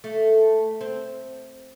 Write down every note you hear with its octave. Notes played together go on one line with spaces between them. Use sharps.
A3
C4